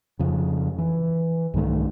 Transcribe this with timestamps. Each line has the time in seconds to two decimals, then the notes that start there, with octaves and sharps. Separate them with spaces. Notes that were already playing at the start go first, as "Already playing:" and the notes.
0.19 F2 C#3
0.78 E3
1.54 C2 G#2 D#3 A3